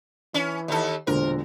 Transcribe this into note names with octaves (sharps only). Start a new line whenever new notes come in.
E3 C#4
D#2 A4
E1 A#2 D3 A#4 C5